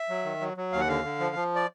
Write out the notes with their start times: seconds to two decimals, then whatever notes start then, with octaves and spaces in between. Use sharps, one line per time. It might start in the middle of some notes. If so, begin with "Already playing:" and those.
Already playing: E5
0.09 F#3
0.25 D#3
0.41 F#3
0.57 F#3
0.73 D#2 F5
0.81 F#5
0.88 D3 F5
1.04 D3
1.20 F3
1.35 F3
1.55 D5